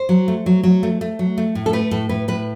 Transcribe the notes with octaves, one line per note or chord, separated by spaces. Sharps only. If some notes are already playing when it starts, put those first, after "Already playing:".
Already playing: C5
F#3
A3
F#3
F#3
A3
A3
F#3
A3
A2
A4
A3 B4
A2 A4
A2 B4
A2 B4